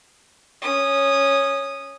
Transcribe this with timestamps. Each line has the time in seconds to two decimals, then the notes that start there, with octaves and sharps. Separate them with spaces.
0.62 C#4 D#6